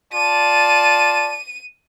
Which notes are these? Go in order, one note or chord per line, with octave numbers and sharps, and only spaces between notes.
F4 D5 A5 D#7